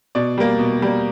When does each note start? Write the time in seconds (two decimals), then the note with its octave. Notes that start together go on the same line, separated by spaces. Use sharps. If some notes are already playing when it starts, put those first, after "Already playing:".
0.15 B2 D5
0.38 G3 A#3
0.59 B2
0.82 G3 A#3